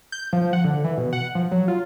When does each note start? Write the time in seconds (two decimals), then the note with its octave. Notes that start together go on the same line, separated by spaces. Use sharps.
0.12 G6
0.33 F3
0.53 F#5
0.64 D3
0.84 E3
0.97 B2
1.13 F#5
1.35 F3
1.51 F#3
1.68 F4